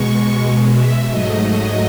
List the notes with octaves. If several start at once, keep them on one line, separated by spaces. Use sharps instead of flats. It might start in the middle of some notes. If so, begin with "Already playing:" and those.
Already playing: B2 G#3 C#6
E5
G#2 F#3 A3 D#5
D#5